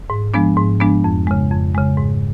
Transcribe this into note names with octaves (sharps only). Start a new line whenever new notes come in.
G#2
F3 G#3 B3 D4
G#2
F3 G#3 B3 D4
F2
C#3 G#3
F2
C#3 G#3
G#2